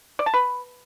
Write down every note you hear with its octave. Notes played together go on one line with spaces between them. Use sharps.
D5
A5
B4